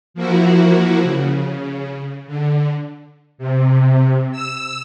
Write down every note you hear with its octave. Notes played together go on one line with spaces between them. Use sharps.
F3 A#3 E4 F#4
C#3
D3
C3
E6